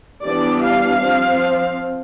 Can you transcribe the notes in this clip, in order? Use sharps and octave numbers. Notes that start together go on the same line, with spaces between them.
E3 G3 B3 D4 D5
F5
F3 C4